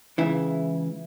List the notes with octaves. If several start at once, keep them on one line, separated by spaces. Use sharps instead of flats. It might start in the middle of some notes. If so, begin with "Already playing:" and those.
C#2 C#3 E3 E4